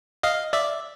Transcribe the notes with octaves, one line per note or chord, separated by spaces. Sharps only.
D#5 F5
D5 E5